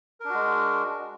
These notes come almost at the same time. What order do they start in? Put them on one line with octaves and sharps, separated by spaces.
A#4 D4 F#4 G#3